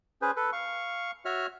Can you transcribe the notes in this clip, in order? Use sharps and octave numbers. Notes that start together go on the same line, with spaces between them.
C#4 G#4 B4 C5
A4 B4
F5 C#6
F#4 C#5 E5 F6